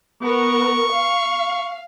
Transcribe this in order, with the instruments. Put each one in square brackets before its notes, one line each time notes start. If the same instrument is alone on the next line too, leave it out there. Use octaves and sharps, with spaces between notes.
[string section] B3 A#4 [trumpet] C#6
[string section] F5